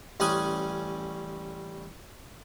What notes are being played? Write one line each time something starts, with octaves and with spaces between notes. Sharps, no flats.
A1 G3 C#4 F#5 G#5 D#6